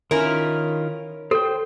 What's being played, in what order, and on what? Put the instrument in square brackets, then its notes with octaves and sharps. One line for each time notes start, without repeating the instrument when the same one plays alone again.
[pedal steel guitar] D#3 F4 [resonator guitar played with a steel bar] C#4 E4 A#4
[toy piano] A4 [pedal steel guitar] C5 G5